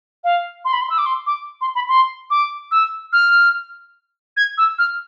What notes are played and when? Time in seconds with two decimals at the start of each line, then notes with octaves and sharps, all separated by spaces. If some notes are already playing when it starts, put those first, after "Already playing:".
0.24 F5
0.65 C6
0.73 B5
0.81 C6
0.90 E6
0.98 D6
1.06 C6
1.27 D6
1.61 C6
1.75 B5
1.89 C6
2.30 D6
2.71 E6
3.13 F6
4.37 G#6
4.58 E6
4.78 F6